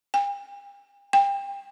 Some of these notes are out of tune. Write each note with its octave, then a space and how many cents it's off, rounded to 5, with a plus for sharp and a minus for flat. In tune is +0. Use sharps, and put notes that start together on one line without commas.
G5 +45
G5 +25